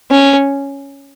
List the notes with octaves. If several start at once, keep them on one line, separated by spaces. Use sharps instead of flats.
C#4